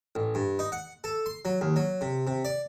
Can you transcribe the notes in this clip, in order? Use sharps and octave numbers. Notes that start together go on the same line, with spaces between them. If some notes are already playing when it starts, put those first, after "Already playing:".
A1
G2
D#4
F#5
A4
C6
F#3
D#2
F#3
C3
C3
D5